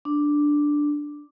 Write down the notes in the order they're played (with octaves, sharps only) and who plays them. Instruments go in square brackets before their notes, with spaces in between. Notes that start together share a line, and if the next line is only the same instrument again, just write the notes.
[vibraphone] D4